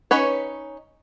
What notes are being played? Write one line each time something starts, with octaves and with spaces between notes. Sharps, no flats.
C#4 D#4 B4 C#5